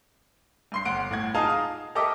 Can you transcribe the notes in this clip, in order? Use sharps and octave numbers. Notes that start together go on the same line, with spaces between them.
G2 C6 C7
G1 F#5 D7
A2 F#5 G#6
D#4 F4 G#4 F5 A5 A#5
D#6
G4 A4 A#4 D#5 E5 D6